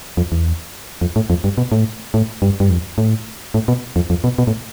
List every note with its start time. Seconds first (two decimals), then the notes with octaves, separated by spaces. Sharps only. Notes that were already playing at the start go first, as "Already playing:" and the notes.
0.17 F2
0.32 E2
1.01 F2
1.16 A2
1.30 F2
1.44 G2
1.58 B2
1.72 A2
2.14 A2
2.42 G2
2.60 G2
2.70 F2
2.98 A2
3.54 A2
3.68 B2
3.96 F2
4.10 F2
4.24 B2
4.38 B2
4.47 A2